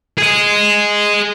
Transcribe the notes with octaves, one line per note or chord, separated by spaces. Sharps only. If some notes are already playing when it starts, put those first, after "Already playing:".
G#4 D#5